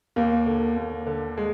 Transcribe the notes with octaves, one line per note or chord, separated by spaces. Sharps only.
D#2 A#3
D3
D#2
D3
G#3